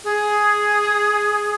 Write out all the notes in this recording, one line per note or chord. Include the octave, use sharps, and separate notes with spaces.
G#4